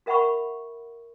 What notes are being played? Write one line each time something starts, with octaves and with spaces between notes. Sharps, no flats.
F#4 A#4 E5 F#5 B5 C#6